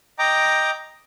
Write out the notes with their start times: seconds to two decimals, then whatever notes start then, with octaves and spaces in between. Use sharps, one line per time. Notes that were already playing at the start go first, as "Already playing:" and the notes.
0.19 D#5 G5 A#5 D6